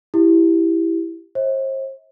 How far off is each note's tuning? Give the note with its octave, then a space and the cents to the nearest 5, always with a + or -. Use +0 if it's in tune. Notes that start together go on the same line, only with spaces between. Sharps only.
E4 +0 G4 +0
C5 +40 E5 -45